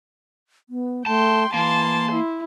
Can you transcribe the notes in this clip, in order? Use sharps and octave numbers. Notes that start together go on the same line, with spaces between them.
B3
A3 G5 A5 C6
E3 A#3 A5 C6
E4